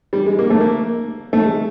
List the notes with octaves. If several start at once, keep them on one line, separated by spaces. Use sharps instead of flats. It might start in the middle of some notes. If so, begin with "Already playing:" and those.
G3
G#3
A#3
A3
A#3
A3
G#3